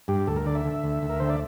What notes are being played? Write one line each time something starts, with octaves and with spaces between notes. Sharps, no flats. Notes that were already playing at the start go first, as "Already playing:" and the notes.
G2 G4
D2 A4
A#4
D3 D5
E5
D3
D2
D2
A#4
D3 C5
D5